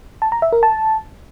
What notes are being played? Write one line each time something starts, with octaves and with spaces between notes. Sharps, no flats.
A5
A#5
E5
A#4
A5